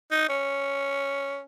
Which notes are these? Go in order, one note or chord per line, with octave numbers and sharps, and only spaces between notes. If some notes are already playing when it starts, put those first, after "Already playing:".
D#4
C#4